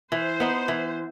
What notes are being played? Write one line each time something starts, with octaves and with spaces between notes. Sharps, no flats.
E3 C5
B3 D#4
E3